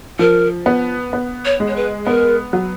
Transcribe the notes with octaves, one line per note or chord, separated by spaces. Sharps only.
F3 A#4
B3
B3
C#5
G#3
C#5
B4
B3 A#4
F#3